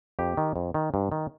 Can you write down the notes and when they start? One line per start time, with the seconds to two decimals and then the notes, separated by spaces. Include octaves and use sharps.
0.19 F2 G4
0.37 D#3
0.56 F2
0.74 D#3
0.94 G2
1.12 D#3